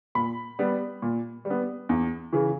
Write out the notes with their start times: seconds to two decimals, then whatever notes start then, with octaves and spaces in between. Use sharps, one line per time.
0.15 A#2 B5
0.59 G3 B3
1.02 A#2
1.45 G3
1.50 B3
1.89 E2
2.33 C#3 E3